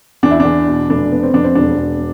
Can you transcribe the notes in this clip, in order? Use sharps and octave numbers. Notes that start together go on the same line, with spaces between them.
E2 D4
E4
E2 D4
B2
F1 D4
B3
C4
F2 D4
C4
E1 D4
E1